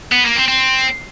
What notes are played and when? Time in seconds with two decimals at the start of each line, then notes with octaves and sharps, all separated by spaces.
0.12 B3
0.24 A#3
0.36 C4
0.48 C4